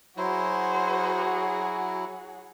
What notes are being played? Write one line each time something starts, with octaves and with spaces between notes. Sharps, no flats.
F#3 E4 F#4 G#4 C5